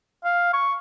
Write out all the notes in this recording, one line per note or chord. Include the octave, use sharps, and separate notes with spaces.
F5
C#6